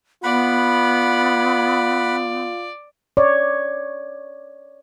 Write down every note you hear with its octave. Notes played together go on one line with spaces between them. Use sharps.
B3 F4 D5 F#5 B5
C#5 D5